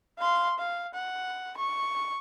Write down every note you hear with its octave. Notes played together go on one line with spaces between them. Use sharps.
F5 C6
F5
F#5
C#6